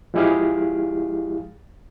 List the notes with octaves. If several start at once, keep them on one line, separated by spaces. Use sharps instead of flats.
F3 G#3 E4 G4 G#4 F5